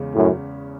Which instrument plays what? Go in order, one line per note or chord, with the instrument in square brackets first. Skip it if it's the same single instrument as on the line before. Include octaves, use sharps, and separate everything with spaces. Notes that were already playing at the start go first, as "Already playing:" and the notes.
Already playing: [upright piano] E2 C#3 G#3 C#4
[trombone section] F#2 A2